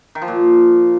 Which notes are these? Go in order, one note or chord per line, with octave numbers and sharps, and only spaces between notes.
D#3
F3
A#2